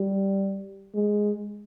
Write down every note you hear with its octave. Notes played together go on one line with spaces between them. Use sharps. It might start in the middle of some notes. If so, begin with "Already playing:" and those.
Already playing: G3
G#3